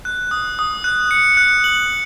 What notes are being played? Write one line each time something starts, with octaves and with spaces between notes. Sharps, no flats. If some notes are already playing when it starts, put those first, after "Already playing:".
F#6
D#6
D#6
F#6
C#7
F#6
F#7